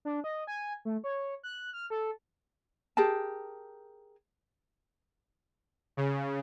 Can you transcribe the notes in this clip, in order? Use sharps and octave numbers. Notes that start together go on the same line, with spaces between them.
D4
D#5
G#5
A3
C#5
F#6
F6
A4
G4 G#4 A#4 A5
C#3